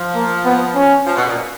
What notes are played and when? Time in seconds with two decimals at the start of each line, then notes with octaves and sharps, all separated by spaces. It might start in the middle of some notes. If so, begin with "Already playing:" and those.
Already playing: F3
0.15 A#3
0.45 B3
0.76 C#4
1.06 F3
1.16 B2
1.27 A#2